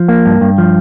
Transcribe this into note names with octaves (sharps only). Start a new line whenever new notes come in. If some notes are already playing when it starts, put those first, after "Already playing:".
Already playing: F3
A#3
G2
G2
F3